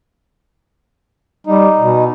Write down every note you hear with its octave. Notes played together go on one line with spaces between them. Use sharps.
G3 D#4
B2